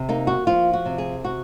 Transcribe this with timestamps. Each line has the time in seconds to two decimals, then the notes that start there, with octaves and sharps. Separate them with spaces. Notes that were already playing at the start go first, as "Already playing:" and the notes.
Already playing: C3
0.09 A#3 D#4
0.27 F#4
0.47 F3 F4
0.73 F#4
0.85 C3
0.98 G#4
1.24 F#4